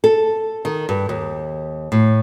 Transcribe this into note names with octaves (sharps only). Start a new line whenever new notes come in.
A4
D#3
G2
D#2
A2